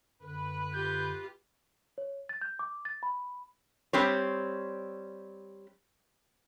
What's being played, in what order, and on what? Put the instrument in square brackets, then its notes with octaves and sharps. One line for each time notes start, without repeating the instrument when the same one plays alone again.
[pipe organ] F#2 D3 [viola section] B4
[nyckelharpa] F4 G4 [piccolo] G6
[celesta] C#5
A6
G6
D6
A6
B5
[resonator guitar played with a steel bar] G3 C4 G4 C#5